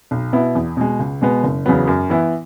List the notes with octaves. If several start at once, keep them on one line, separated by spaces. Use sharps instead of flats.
B1
B2 B3 E4
E2
B2 G#3
C#2
B2 G#3 B3
F#1
E2 C#3 F#3 B3
F#2
E3 B3 E4